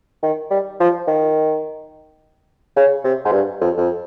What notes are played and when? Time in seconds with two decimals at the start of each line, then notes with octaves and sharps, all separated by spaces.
0.23 D#3
0.51 G3
0.80 F3
1.07 D#3
2.77 C#3
3.04 C3
3.25 G#2
3.32 G2
3.61 F2
3.78 F2